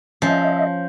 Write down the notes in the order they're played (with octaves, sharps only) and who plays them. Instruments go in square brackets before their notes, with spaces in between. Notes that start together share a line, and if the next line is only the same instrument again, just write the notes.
[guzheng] F3 [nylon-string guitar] C#4 [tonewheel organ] D#5 E5